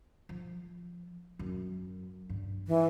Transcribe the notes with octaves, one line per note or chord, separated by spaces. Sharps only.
F3
F#2
G2
E3